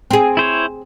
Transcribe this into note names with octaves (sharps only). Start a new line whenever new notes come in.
C4 G#4
E4 C5 C#5